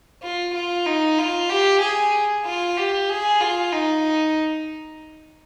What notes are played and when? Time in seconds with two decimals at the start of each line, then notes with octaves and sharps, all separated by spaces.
0.22 F4
0.54 F4
0.86 D#4
1.19 F4
1.50 G4
1.81 G#4
2.45 F4
2.77 G4
3.09 G#4
3.40 F4
3.73 D#4